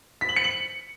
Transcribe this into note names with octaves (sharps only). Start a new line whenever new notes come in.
B6
F#7
C#7
F#7